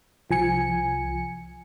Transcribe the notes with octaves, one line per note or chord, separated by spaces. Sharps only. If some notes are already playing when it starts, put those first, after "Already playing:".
C2 F3 G#5 C#7